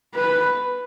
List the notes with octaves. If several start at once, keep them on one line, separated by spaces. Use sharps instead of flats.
B4